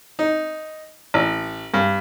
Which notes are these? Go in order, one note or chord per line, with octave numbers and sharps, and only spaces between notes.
D#4
A1
G2